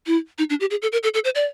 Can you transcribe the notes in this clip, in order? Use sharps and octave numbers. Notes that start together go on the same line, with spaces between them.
E4
D#4
D4
G4
G#4
A4
A#4
A4
A4
C5
D5